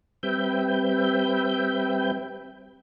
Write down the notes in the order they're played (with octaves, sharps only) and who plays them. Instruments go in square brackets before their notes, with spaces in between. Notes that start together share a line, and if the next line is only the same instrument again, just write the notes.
[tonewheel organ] G3 C4 B4 E5 G5 G6